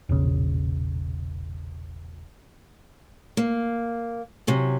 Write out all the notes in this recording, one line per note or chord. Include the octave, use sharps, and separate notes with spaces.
E1 A#1 C#3
A#3
C3 F#3 C#4